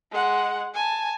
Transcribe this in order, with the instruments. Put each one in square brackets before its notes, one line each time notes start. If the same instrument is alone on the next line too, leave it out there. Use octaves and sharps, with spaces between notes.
[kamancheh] G#3 F#5
G#5 A5